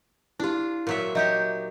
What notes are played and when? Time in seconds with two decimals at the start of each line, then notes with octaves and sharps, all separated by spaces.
0.40 D4 E4 F4 G4
0.87 A#2 F#3 E5
1.15 F#3 D#4 G4 D#5 E5 G6